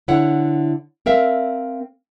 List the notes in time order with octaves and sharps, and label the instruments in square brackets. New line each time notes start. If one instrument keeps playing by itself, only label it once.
[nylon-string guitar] D3 E4 C#5 F#5
C4 A#4 E5 F5